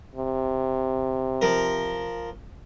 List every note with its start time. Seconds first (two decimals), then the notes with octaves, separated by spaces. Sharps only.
0.15 C3
1.42 F3 A#4